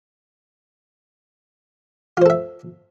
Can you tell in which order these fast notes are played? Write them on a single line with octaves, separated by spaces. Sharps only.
F4 C5 A4 E5